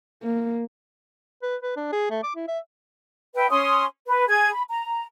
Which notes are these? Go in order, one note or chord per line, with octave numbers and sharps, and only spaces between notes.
A#3
B4
B4
D4
G#4
A3
D6
E4
E5
B4 E5 G5
C#4 C6 D#6
B4
G#4 G#6
B5
A#5